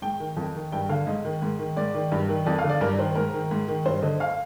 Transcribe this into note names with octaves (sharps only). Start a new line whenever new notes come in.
G#2 G5
D#3
F2
D#3
G2 G5
D3 F5
G#2 D#5
D#3
G#2
D#3
G#2 D5
D#3
G2
D#3
F2 D5
F5
D3
D5
G2 A#4
D#3 C5
G#2 A#4
D#3
G#2
D#3
G2 C5
D3 D#5
F5